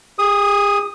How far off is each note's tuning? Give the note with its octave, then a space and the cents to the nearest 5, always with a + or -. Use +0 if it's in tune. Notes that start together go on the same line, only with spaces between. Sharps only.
G#4 -45 D#6 +0